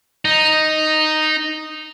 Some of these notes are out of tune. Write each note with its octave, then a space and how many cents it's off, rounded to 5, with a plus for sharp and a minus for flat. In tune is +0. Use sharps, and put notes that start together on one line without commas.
D#4 -5